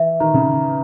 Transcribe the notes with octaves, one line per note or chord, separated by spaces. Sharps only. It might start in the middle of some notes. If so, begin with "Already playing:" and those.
Already playing: E3 E5
D#3 A#5
C#3